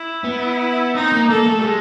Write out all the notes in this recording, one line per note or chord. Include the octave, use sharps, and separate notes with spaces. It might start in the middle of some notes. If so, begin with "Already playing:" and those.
Already playing: E4
B3
C4 D#4
A#3
A#3 A4
A3
G3
G#3